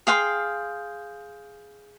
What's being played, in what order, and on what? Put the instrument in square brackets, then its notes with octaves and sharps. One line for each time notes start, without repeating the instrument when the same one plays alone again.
[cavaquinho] G#4 F5 G5 C6